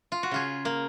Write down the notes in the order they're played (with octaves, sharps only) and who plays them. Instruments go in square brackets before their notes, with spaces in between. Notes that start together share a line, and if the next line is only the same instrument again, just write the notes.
[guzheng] F4
F#4
C#3 F4 G#4
A#3